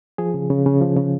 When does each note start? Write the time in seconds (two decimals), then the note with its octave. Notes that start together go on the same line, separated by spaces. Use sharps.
0.18 F3 G#4
0.34 C#3
0.50 C#3
0.66 C#3
0.81 F3
0.96 C#3